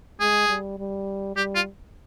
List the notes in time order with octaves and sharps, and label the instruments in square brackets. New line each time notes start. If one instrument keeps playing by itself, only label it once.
[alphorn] G#3 [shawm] G#4
[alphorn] G3
G3
[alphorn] G3 [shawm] G4
[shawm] F4